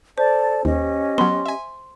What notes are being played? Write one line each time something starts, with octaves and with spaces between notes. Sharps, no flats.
A4 C5 D5 A5
D#2 C#4 G4 D#5
F#3 B3 C6
E5 G#5